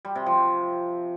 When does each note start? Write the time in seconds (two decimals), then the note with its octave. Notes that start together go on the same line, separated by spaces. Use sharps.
0.05 G3
0.15 C3
0.26 F3